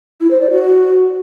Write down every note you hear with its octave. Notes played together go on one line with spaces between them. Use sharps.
E4
C5
D5
F#4